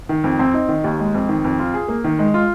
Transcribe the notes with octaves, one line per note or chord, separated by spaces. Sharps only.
D#3
F2
C4
D#4
D#3
D#2
G#3
F2
D#3
F2
F4
G#4
A#3
D#3
G#3
F4